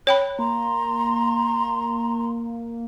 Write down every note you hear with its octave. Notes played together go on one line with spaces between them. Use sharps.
C#5 G5 B5 F#6
A#3 A#5 C6